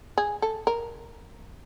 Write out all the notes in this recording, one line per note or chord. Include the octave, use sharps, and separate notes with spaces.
G#4
A4
A#4